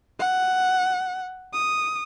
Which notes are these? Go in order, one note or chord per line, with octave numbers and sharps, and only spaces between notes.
F#5
D#6